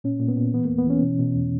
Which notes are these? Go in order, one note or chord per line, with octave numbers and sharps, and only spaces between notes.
A#2 C#4
A#2
B3
A#2
E3 B3
A#3
E2
B3
E3 C#4
B2
B2
E2